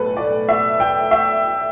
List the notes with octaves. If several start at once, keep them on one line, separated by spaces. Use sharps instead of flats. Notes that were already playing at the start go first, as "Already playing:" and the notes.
Already playing: B1 A2 G3 A4 B4
D5
E5
G5
E5